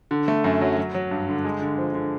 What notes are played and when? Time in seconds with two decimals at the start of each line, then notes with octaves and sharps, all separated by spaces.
0.11 D3
0.28 A3
0.44 F#2
0.61 F#3
0.77 F#3
0.94 F#3
1.11 G2
1.29 D3
1.44 G#3
1.62 D3
1.78 F3
1.94 D3